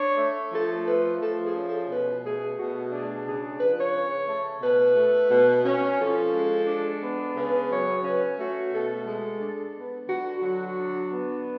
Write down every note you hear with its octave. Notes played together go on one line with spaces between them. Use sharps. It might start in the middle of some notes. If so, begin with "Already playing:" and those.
Already playing: D4 C#5
A3
F3 A4
A3 B4
F3 A4
G#4
C#4
A4
B2 B4
A3 G#4
B2 F#4
D4 G#4
C#3 G#4
F3 B4
C#5
C#3
A3
B2 B4
A3
B2
C#4
F3 A4
G#3
D4
B3
C#3 B4
F#3 C#5
C#4 B4
A3 F#4
B2 A4
G#3
D4
B3
D3 F#4
F#3 F#4
D4
B3